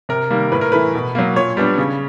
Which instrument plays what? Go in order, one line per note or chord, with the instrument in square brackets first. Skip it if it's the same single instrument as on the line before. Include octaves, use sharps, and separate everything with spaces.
[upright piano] C3 A#4
D#3 G3 A#3
A2 B4
A#4
E3 A3 B4
B2
F#3 A#3
A#2 C#5
G3 B3 D4
C#3